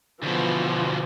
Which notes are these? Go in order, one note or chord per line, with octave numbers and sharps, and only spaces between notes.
D2 B2 E3 F3